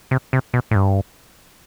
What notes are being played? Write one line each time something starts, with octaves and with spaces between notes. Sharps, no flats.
C3
C3
B2
A2
G2